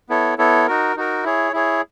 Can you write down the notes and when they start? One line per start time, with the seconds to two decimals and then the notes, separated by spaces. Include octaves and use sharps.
0.09 B3 E4 A4 C#5
0.38 B3 E4 A4 C#5
0.67 D#4 F#4 A#4
0.96 D#4 F#4 A#4
1.24 E4 G#4 C#5
1.53 E4 G#4 C#5